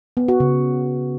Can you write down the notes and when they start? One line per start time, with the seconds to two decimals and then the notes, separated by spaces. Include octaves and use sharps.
0.17 B3
0.28 F#4
0.40 C#3